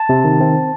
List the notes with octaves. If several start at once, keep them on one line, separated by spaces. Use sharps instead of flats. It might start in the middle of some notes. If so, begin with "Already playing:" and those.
Already playing: A5
C3
D#3
C4